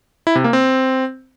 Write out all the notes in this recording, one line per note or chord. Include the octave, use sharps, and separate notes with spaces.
E4
C3
A#3
C4